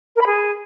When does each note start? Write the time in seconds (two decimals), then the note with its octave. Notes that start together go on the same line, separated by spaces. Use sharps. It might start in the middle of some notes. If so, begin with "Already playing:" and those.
0.15 A#4
0.21 B5
0.26 G#4